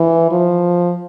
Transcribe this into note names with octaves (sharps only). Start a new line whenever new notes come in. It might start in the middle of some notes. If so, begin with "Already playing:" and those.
Already playing: E3
F3